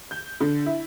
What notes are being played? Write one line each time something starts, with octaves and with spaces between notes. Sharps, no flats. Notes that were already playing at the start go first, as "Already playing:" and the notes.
G6
D3
E4